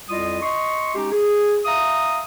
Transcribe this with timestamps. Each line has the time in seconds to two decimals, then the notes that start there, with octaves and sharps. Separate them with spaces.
0.10 F2 G3 E4 F4 D#5 D#6
0.43 D#5 C6 C#6
0.95 G#3 C#4 D#4 G4
1.11 G#4
1.65 E5 F5 A#5 D#6